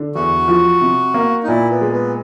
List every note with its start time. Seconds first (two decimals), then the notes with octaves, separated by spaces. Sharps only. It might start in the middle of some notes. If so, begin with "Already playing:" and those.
Already playing: D3
0.15 E2 F#4
0.48 F3
0.81 C3
1.14 A#3
1.43 D#4
1.48 A#2 E4
1.70 B3
1.81 G#3
1.92 B3